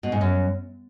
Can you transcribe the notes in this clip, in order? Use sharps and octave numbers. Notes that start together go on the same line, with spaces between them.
B2
G#2
F#2